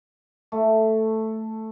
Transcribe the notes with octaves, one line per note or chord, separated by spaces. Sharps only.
A3